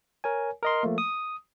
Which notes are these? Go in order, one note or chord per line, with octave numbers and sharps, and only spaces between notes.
A#4 C#5 G#5
A#4 D#5 C6
F3 A3 A#3
D#6